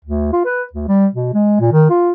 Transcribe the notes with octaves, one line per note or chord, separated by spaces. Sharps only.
D2
F4
B4
D2
G3
B2
G#3
A#2
D#3
F4